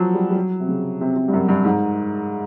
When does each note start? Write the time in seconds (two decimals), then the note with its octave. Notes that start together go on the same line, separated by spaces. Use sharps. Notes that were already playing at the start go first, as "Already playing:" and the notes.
Already playing: F3 F#3
0.14 G3
0.30 G3
0.35 F#3
0.60 C3
0.68 C#3
1.01 C3
1.16 C3
1.28 G2
1.33 F#2
1.49 G2
1.64 G#2